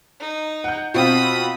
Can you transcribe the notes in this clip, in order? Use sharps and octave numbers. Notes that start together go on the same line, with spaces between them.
D#4
F#5 G6
B2 C4 F4 B5 D#6